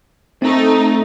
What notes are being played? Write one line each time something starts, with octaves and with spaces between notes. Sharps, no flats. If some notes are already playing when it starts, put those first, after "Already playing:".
A3 C4 D#4